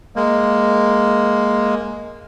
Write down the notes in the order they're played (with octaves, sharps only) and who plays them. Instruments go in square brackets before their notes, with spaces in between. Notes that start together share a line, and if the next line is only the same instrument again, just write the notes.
[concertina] G#3 A#3